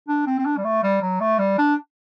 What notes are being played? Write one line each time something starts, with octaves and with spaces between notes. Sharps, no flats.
D4
C4
C4
D4
G3
A3
G3
F#3
A3
G3
D4